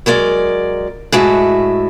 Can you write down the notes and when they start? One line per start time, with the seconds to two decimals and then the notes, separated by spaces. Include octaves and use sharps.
0.06 F#3 G#3 A#4 D5
1.12 A2 G#3 F#4 E5